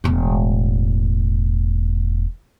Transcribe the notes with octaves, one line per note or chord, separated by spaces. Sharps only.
E1 A2